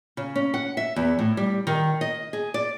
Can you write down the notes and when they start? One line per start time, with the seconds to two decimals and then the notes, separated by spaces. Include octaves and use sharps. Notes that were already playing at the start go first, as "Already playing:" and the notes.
0.17 C#3
0.35 C#4
0.54 F#5
0.77 E5
0.96 E2
1.19 A2
1.37 G3
1.67 D#3
2.01 D#5
2.33 G#4
2.54 D5